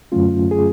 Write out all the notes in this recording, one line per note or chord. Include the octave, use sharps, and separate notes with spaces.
F#2 D3 F#3 A3 C#4 F4
G#4